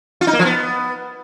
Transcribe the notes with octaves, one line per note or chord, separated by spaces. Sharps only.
F4
D#4
A#3
F3
B3